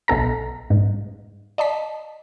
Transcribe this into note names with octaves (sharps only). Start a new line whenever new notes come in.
B1 B3 A4 A#5
G#2
D5 D#5 A5 B6